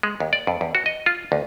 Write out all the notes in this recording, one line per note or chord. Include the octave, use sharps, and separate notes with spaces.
G#3
D#2
D5
F2
E2
F#4
D#5
F4
D2